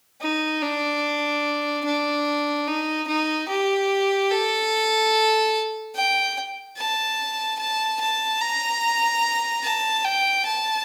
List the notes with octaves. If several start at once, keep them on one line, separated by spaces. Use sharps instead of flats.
D#4
D4
D4
D#4
D#4
G4
A4
G5
A5
A5
A5
A#5
A5
G5
A5